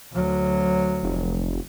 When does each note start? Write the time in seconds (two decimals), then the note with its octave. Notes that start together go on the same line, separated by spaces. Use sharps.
0.13 D2 F#3
1.03 F1